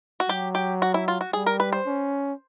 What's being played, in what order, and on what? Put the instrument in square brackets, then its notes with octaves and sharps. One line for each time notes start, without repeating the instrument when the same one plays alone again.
[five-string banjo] F#4
[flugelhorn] F#3 [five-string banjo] G4
[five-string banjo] G4
F#4
E4
F4
F#4
[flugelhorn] G3 [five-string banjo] G#4
[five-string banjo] A#4
B4
C5
[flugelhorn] C#4